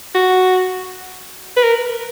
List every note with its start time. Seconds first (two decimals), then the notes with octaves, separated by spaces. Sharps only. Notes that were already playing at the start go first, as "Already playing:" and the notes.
0.15 F#4
1.57 B4
1.63 A#4